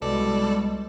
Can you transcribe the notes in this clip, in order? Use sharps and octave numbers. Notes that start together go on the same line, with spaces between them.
C2 B2 G3 G#3 A4 D5